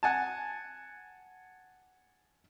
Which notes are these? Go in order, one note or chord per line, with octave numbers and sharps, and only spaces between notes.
F#5 G#5 A5